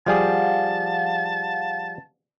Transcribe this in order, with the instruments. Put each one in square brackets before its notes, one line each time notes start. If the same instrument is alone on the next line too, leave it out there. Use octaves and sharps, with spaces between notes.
[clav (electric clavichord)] F3 G3 G#4 [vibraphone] F5 F#5 [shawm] A5